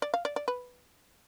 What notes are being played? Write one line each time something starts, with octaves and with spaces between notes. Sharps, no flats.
D5
F5
D5
D5
B4